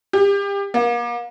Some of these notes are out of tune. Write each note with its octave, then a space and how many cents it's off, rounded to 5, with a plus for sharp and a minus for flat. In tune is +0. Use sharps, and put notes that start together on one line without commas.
G4 +30
A#3 +35